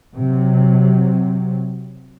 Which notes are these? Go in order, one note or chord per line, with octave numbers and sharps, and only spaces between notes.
C3 F#3